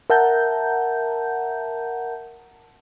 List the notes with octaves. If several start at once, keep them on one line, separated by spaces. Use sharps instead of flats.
A#4 E5 F#5 A5 A#5 G6